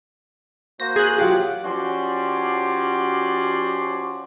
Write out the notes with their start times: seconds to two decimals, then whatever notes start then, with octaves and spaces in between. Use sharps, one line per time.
0.80 A#3 F#4 C5 A#6
0.96 G#4 F#6
1.18 F#3 F4 G4 F#5 D6
1.64 F3 C#4 F#4 G4 D5 C6